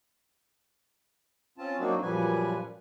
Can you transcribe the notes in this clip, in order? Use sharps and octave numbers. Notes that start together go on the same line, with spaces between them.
C4 C#4 F4 A5
F#3 A#3 C4 D4 D#4 F#4
F#2 A#2 F3 G3 B4 G#5